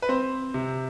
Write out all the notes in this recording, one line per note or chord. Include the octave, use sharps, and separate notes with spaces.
B4
C4 C5
C3